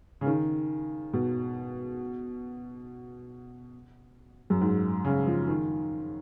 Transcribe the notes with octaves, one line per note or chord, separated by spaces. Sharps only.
C#3
D#3
B2
F#2
G#2
C#3
F3
D#3